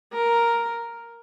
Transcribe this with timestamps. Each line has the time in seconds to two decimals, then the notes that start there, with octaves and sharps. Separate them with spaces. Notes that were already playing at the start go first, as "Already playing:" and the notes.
0.14 A#4